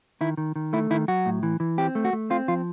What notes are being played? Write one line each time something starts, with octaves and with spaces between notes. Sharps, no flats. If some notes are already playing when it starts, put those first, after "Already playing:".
D#3 E4
D#3
D#3
A3 E4
D#3 E4
F#3 F#4
A2
E3
E3
C4 G4
A3
F#4
A3
C4 F4
F3 F4